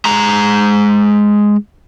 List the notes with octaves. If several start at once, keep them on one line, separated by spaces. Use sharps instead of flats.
G#3 A#5